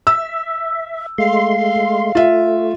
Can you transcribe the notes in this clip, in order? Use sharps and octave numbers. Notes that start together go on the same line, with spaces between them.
E5 E6
G#3 A3 F5 C6
A3 F4 E5